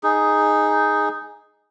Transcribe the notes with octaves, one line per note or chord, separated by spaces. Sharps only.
D#4 G#4